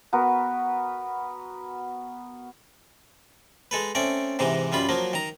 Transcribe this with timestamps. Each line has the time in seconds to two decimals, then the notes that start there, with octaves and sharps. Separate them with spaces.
0.13 B3 F#4 A#4 B4
3.71 G#3 A4 B4
3.95 A3 C4 C#4 D5
4.39 G#2 C3 E3 D#4
4.72 F#2 G3 F4 B5
4.89 F3 F#3 A#3
5.13 D#3 A#5